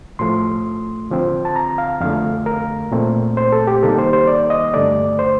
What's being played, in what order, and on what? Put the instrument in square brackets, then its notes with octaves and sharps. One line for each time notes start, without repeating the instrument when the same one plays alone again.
[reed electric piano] A2 F3 A3 C6
D3 F3 C4
A5
A#5
F5
F2 D3 A3 F5
A#4
A#2 A3 C4
C5
A4
G4
C3 D#3 G3 A#3 A4
C5
C5
D5
D#5
G2 D3 A3 D5
C5